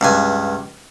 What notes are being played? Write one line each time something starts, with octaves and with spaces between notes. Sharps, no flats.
C#2 G2 G#5